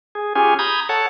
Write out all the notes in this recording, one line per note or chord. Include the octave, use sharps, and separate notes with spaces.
G#4
C#4 F4 G4 G#4 G#5
A#5 B5 D#6 G6 G#6
A4 C#5 F#5 A5